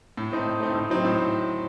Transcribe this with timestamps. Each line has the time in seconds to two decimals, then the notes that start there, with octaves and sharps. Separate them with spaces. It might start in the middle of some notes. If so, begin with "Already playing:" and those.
0.17 A2
0.31 A3 C4 D#4
0.46 A2
0.60 A3 C4 D#4
0.75 A2
0.90 F#3 C4 D#4
1.05 A2